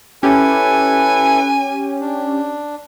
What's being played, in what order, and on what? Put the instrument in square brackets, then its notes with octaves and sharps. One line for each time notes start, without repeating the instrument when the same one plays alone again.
[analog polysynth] C#4 G4 [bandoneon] E4 A4 B4 [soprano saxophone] G#5
[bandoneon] D4